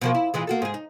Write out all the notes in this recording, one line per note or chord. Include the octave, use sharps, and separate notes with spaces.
B2 F3 A#3
E4
A#2 E3 G#3
A#3 F#4 A4
G#2 G#4
D#4